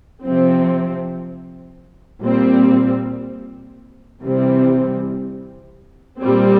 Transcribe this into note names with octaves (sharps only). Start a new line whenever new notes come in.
C3 F3 C4
A#2 G3 C4
C3 E3 G3 C4
A#2 G3 C4